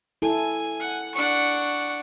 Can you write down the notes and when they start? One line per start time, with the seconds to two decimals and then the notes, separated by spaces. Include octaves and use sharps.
0.22 E4 A4 G#5
0.79 F#5
1.14 D4 F#5 C#6